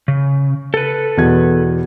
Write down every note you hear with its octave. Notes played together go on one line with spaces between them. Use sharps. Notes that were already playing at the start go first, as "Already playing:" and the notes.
C#3
A4 B4
E2 B2 G#6